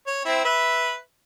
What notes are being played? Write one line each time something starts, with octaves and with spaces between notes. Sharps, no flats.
C#5
C4 E4
B4 E5